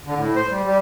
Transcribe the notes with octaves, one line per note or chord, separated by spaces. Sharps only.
D3
A2
C5
G3
G3